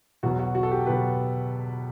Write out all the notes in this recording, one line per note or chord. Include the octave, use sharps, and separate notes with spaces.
E2 B2 F#3 F#4
F#4
F#4
A4
G4
B2 F#3 B4